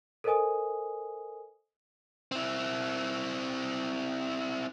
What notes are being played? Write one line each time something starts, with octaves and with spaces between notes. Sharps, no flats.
A4 A#4 C5 D#5 G#5 D#6
C4 E4